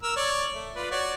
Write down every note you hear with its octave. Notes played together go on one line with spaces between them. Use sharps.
A#4 E6
C#5 D5
A3
F4 B4 D5
F#4 C#5 D5